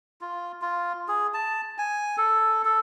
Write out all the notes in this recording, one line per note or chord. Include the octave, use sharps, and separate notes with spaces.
F4
F4
G#4
A5
G#5
A4
A4